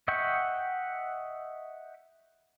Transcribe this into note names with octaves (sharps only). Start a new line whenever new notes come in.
D#5 E5 F#5 G5 C#6